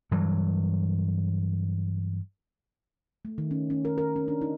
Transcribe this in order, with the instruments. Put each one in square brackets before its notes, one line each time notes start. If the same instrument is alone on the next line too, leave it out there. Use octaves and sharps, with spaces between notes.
[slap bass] G2 E3 F#3
[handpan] A3
D#3
C#4
C#4
A#4
A#4
C#4
D4
D#4